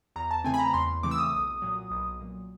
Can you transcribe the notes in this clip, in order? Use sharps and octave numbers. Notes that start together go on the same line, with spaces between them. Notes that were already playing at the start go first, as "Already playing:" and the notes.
E2 A#5
A5
C#3 E3 A3 C4 G#5
B5
A#5
E2 C6
C#3 E3 A3 C4 D6
E6
D#6
B1
A#2 F#3
B1
A#2 F#3